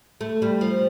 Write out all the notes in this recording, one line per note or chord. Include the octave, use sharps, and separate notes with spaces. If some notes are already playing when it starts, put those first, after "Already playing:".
A3
G3
F3